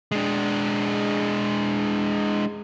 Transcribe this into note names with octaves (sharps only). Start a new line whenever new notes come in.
G#3 D4